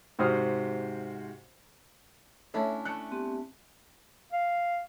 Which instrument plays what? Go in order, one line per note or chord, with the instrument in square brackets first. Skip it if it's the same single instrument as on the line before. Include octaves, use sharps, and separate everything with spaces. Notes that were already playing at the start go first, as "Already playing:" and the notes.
[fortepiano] G#2 C3 F#4 C5 D#6 F6
[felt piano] A3 C#5 E5 [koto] C#4 D4 E4
[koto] A3 [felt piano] F#6 C#7
[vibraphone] B3 C4 G4
[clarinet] F5